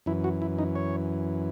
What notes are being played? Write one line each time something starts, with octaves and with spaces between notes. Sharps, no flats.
F#2 E3 E4
F#4
E4
D#4
C#5